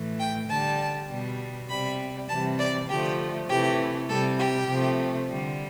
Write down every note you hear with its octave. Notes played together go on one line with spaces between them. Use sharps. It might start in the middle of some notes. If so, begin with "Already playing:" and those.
Already playing: A2 E3 A3
G5
D3 G3 A5
B2 G3
C3 G3 B5
C3 E3 G3 A5
D5
D3 F3 A3 G4
C3 E3 A3 G4
C3 G3 A4
G4
C3 F3 A3
D3 G3